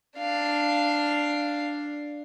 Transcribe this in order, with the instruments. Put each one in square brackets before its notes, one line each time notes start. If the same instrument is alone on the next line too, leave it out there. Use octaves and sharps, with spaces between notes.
[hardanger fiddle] D4 F5